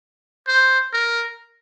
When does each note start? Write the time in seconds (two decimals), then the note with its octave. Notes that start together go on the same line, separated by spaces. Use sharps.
0.48 C5
0.93 A#4